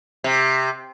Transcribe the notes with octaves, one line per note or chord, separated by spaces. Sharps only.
C3